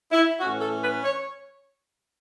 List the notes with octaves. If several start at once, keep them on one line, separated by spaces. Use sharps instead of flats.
E4
A2 E3 C#4 F#4
A4
B4
C#5